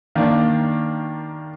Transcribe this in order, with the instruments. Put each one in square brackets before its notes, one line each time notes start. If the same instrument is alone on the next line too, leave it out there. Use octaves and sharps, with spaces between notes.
[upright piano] D#3 A#3 D4